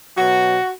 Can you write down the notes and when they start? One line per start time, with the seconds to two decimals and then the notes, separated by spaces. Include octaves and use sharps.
0.18 B2 F#3 F#4